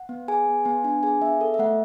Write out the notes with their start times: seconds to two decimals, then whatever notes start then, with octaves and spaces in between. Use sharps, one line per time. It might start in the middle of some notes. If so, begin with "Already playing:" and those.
Already playing: F#5
0.09 B3
0.28 G#4 G#5
0.46 B3
0.65 B3 G#5
0.84 D4 G#5
1.03 G#4 G#5
1.21 B3 E5
1.41 A4
1.54 E5
1.59 A3 F#5